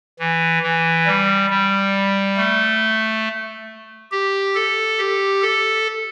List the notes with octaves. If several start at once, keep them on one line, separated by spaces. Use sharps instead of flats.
E3
E3
G3
G3
A3
G4
A4
G4
A4